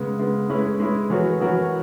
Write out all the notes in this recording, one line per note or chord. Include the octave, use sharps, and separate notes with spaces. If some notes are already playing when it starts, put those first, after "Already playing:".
Already playing: C#3 G#3 B3
C#3 G#3 B3
G#3 C#4 E4 B4
G#3 C#4 E4 B4
E3 B3 F#4 A#4 C#5
E3 B3 F#4 A#4 C#5